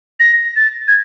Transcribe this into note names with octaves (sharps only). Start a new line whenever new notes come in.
A#6
A6
G#6